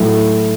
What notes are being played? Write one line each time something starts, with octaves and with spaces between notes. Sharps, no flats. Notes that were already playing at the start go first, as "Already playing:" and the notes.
Already playing: A2 F#3 A3